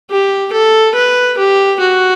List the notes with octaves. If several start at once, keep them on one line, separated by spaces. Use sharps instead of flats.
G4
A4
B4
G4
F#4